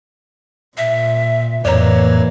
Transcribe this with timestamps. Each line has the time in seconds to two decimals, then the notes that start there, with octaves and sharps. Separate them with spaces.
0.78 A#2 E5
1.65 F2 A2 E3 A#3 C#5 D5 A#5